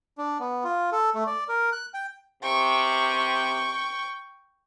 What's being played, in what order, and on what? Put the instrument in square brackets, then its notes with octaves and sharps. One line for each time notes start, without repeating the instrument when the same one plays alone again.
[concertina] D4
B3
F4
A4
A3
D5
A#4
F#6
G5
[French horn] C3 [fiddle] G5 C#6